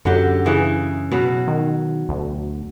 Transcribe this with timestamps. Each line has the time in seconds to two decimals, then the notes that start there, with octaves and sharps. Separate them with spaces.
0.05 F#2 D3 F#3 G4
0.45 C#3 E3 G#4
1.12 B2 F#3
1.48 D#3
2.09 D2